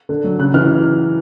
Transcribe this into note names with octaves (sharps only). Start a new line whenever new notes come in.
D3
F#3
C#3 F#6
E3 F6